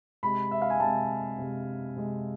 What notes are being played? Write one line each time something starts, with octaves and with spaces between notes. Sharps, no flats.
C3 G#3 B5
E5
F5
G#5
C3 G#3 A5
C3 G#3
C3 G#3